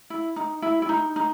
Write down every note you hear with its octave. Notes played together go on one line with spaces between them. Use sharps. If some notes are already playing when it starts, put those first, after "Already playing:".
E4
D#4
E4
E4
D#4
D#4